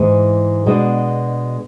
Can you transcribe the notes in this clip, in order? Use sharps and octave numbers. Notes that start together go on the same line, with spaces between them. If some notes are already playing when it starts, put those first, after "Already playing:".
Already playing: G#2 E3 G#3
B2 G#3 B3 D4 F#4